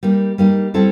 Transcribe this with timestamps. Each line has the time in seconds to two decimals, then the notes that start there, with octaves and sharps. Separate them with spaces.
0.03 G3 A#3 D#4
0.38 G3 A#3 D#4
0.74 G3 C4 E4 A4